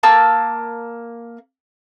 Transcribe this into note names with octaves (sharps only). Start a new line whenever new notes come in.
A#3 A5 E6